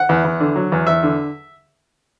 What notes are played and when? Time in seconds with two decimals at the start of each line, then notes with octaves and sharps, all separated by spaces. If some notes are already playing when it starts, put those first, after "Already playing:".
Already playing: F#5
0.09 E2
0.25 E2
0.40 D3
0.56 F#3
0.72 E2
0.87 E2 E5
1.03 D3